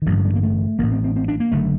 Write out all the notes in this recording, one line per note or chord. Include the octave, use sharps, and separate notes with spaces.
D#3
A1 G2 D3 F#3
F#3
G3
A#3
A3
A1 A2 A#3
C4
C4
C4
D4
A#3
F#1 D3 A3